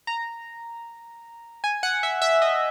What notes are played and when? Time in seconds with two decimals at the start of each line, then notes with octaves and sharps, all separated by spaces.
0.07 A#5
1.64 G#5
1.83 F#5
2.03 E5
2.22 E5
2.42 D#5